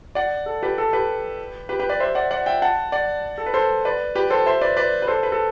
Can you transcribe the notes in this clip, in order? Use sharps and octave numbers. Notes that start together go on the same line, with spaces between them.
D5 F#5
A4
G4 B4
A4
G4 B4
G4 B4
G4 B4
B4 D5
C5 E5
D5 F#5
D5 F#5
E5 G5
F#5 A5
D5 F#5
A4
B4
A4 C5
B4 D5
G4 B4
A4 C5
C5 E5
B4 D5
B4 D5
B4
A4 C5
B4
A4